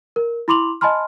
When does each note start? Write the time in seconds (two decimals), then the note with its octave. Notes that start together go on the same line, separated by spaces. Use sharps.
0.16 A#4
0.48 E4 B5 C6 D6 F7 F#7
0.81 D#5 G#5 A5 B5 C6 F6